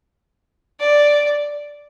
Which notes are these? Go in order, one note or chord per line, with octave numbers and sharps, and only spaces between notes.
D5